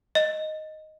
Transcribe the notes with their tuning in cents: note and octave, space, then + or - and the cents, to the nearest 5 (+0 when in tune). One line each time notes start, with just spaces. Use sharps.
D#5 +0